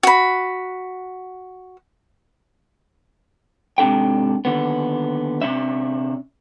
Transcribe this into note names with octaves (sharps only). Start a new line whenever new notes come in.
F#4 B5
G#2 C3 D4 A4 G5
D#2 D3 B3
C3 C#4 D4 E5